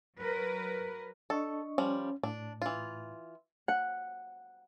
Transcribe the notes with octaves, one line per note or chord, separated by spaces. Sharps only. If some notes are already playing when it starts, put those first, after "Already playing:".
F#3 A#4 B4
D4 A4 D#5 C#6
F3 G3 C#4
A2 D4
E3 F4
F#5